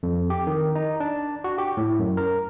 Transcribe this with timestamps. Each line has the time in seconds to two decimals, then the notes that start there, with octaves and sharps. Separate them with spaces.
0.03 F2
0.30 G4
0.47 D#3
0.75 D#4
1.00 D4
1.44 F#4
1.58 G4
1.77 A2
1.99 F#2
2.17 A#4